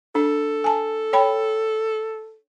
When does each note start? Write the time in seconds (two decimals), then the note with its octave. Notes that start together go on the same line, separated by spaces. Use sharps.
0.15 D4 A4
0.64 G#5 A5
1.13 C#5 G5 B5